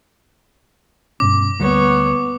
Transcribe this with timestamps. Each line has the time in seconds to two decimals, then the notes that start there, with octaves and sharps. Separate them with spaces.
1.20 G2 B2 C#4 D6
1.60 D2 G3 A#3 B3 C#5